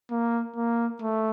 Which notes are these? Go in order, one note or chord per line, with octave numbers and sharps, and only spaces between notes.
A#3
A#3
A3